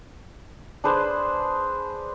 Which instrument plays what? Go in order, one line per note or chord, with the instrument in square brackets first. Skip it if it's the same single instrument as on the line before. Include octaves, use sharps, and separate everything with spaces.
[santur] D4 G#4 B4 C5